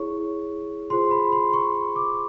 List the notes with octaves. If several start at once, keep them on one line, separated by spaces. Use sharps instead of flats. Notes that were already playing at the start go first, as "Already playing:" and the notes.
Already playing: E4 G#4 C#5 C#6
F4 G#4 C5 C6
B5
C6
C#6
D6